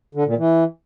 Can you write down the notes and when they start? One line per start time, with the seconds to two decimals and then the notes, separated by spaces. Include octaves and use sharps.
0.15 D3
0.26 A#2
0.38 E3